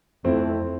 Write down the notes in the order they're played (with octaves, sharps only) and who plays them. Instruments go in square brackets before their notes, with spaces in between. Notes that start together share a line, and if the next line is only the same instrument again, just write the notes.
[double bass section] F2 [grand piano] A3 C4 E4